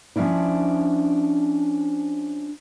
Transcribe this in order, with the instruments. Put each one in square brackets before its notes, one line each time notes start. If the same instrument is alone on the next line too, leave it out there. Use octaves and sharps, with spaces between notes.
[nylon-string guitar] F3 A#3 C#4 D4 E4